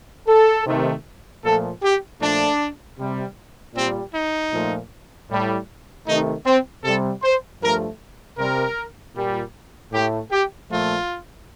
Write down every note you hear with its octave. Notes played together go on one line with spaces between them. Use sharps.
A4
C3 D#3 A3
A#2 F3 A3 A4
G4
A#2 F3 A3 D4
C3 G3
A#2 G3 C4
D#4
A#2 F3 A3
A2 G3
C3 D#3 A3 D#4
C4
C3 G3 A4
C5
G2 F3 A3 A#4
C3 G3 A#4
A#2 G3
A2 A3 G4
G4
A#2 F3 A3 F4